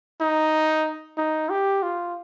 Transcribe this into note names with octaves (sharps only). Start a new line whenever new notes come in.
D#4
D#4
G4
F4